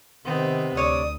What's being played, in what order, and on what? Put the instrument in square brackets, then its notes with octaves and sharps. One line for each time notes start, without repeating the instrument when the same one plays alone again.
[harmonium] C3 [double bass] D#3 [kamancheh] B3 C4
[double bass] D2 [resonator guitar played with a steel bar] C#5 D5 [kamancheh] D#6